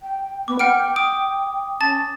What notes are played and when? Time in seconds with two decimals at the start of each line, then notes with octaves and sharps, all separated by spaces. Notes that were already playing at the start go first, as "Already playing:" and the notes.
0.01 G5
0.48 B3 D6
0.59 F#5 G5 F6 D7
0.96 D#6 D7
1.81 C#4 A5 A6